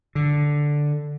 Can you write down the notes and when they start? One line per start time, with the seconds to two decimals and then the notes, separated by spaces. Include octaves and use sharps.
0.15 D3